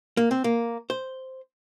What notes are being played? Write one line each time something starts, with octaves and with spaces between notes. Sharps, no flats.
A#3
C4
A#3
C5